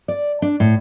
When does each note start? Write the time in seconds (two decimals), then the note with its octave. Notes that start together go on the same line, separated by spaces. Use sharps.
0.08 D5
0.42 D4
0.60 A2